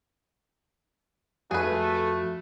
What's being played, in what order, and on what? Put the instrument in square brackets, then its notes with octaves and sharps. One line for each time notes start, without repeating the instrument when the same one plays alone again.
[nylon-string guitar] F2 [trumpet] A3 [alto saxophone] F#4 [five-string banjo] G#4 B4